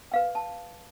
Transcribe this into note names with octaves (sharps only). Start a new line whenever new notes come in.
B4 F5 G5
A5